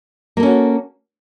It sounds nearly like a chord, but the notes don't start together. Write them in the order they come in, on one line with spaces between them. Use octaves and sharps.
A#3 A4 C#4 F#4